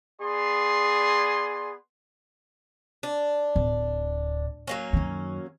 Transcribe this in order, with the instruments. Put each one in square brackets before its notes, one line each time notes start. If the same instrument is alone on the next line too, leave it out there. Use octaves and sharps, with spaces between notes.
[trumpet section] B3 G#4 D5 C6
[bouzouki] D4
[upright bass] D1
[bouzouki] F#3 A#3 C#4
[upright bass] F#2 D#3